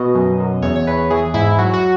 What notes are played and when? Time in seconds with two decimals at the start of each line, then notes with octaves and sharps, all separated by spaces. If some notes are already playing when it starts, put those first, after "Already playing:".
Already playing: B2 D#5
0.15 F#2
0.40 F#2
0.62 E2 C#5
0.76 C#5
0.87 E2 B4
1.10 E3 G#4
1.34 G#2 E4
1.59 F#3 F#4
1.74 F#4